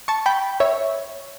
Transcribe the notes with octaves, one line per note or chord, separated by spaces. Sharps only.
A5 C#6
G5 B5
C#5 E5